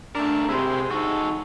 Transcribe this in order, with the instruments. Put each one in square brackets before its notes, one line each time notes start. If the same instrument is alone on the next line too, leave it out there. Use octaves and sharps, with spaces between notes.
[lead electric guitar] A3 A#4 [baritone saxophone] D4
[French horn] C3 [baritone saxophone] G#3 [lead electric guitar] E4 C5
[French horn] D#4 [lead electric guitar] F#4 A4